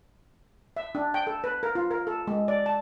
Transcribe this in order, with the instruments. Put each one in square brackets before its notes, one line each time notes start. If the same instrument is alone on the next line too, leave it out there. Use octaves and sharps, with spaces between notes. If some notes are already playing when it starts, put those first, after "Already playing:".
[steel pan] E5
D4
G5
A4
B4
A#4
F4
A#4
A4
G#3
D5
A5